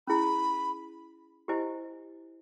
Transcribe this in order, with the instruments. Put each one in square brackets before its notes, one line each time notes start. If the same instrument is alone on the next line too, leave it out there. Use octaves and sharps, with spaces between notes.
[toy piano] C#4 E4 G#4 [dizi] B5
[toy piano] E4 G4 C5 D#5 G#5